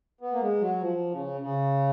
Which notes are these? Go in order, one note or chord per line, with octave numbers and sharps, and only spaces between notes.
B3
A#3
G#3
F#3
F3
C#3
C#3